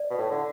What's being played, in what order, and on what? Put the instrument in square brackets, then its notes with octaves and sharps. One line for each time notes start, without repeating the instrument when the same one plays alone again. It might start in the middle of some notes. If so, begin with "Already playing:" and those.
Already playing: [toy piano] D5
[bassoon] B2
A2
D3